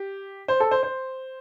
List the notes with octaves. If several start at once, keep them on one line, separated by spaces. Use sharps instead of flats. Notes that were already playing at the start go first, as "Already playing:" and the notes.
Already playing: G4
C5
A4
C5
C5